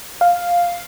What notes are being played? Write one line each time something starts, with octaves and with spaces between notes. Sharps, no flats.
F5